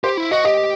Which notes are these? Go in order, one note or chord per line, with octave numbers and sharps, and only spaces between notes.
G4 C5
E4
F#4 D#5
G4 D#5